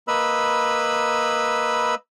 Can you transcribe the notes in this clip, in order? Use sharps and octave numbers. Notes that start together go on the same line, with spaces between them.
A#3 B4 D#5 B5 E6